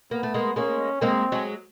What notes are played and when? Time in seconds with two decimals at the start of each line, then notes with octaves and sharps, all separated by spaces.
0.11 A#3 B3
0.23 A3
0.34 G#3 A#3
0.56 G#3 A#3 C#4
1.01 G#3 A#3 C4
1.32 F#3 G#3